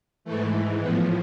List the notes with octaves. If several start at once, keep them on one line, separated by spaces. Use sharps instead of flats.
G#2 E3 A3
A2 F3 B3